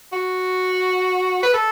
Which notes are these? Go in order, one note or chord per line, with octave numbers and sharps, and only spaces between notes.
F#4
B4
A4